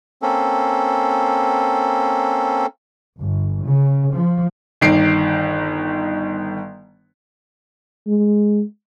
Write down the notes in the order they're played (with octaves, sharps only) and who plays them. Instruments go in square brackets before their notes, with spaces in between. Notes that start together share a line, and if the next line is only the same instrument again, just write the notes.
[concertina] A#3 C4 C#4 A4
[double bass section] G1
C#3
F3
[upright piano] G1 D#3 C7 D7
[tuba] G#3